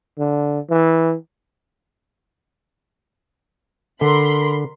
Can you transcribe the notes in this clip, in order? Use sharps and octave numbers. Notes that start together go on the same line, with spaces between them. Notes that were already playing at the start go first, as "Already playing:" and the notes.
D3
E3
D3 A#4 B5 C6